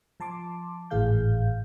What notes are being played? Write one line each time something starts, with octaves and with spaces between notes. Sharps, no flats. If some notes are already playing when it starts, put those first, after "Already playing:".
F3 A5 C6 D6
G#1 A2 E3 G#4 F5 G6